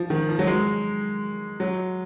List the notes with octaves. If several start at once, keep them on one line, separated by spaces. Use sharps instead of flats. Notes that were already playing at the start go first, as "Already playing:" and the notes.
Already playing: F3
D#3
F3
F#3
G#3
F#3